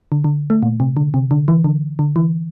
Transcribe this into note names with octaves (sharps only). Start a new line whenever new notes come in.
D3
D3
A3
A#2
C3
D3
C3
D3
E3
D3
D3
E3